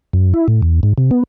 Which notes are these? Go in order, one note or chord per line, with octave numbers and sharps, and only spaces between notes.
F#2
E4
A2
E2
G#2
C3
B3